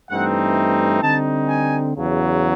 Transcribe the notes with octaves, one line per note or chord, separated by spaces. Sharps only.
G2 E3 A3 C4 D#4 F#5
D3 G3 C4 D#4 A5
G#5
E2 C#3 F#3